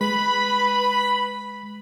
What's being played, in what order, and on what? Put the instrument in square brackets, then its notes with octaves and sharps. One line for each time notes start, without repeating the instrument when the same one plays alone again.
[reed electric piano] G#3 [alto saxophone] B4 [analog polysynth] B5